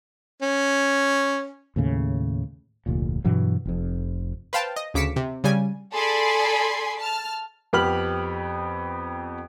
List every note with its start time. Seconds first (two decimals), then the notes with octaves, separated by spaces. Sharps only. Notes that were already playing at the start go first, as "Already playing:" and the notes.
0.42 C#4
1.76 D#2 A2 C#3
2.86 F1 D2 A#2
3.25 G2 B2 E3 F#3
3.65 F1 F2
4.53 B4 C5 F5 G5 A5
4.76 D#5
4.94 D2 C#3 D6 B6 C#7 E7
5.16 C3
5.44 C#3 G3 G#5
5.93 G#4 A4 D5 G#5 B5 C6
7.00 A5 F6
7.73 F2 B3 G4 B5 F6 F#7